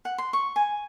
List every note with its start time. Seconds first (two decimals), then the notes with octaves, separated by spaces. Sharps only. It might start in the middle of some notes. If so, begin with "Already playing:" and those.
0.05 F#5
0.18 C6
0.33 C#6
0.56 G#5